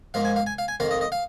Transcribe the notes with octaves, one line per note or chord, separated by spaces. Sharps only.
G#2 F3 A#3 F5
G#5
F5
G#5
F5
G#5
F2 D#3 A#3 F5
D#5
D#5
F5